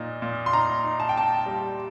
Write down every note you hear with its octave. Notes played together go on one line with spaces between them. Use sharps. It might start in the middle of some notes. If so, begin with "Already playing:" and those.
Already playing: A#2 D#4
A#2
C6
D#4 A#5
D#4
A5
G5
D#4 A5
G3